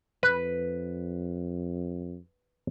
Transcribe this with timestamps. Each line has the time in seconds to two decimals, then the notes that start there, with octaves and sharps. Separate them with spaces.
0.23 F2 B4